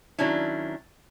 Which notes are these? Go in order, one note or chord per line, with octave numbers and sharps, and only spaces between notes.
D#3 F#3 C#4 D4 E4